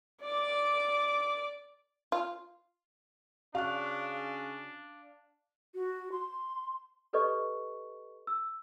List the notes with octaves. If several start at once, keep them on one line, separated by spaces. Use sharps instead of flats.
D5 D6
F4
C#3 D4 F#4 F5 C#6 F#6
F#4
C6
G4 A4 B4 D5 D#5 C#6
E6